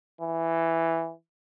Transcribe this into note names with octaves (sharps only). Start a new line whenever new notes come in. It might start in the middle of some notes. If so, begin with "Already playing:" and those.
E3